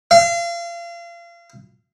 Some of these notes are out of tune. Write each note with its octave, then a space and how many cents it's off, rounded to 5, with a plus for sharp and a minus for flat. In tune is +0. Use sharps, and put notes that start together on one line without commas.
F5 -35